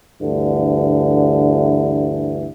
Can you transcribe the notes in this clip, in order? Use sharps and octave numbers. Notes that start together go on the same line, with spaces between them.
D2 G2 D3 E3